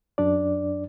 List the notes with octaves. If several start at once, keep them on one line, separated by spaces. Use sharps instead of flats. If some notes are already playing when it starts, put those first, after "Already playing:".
F#2 D4 D5